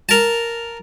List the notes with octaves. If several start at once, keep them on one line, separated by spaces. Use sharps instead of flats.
A#4 A5